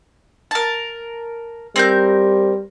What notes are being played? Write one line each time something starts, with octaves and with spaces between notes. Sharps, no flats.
A#4 A5
G3 C4 A#4 G6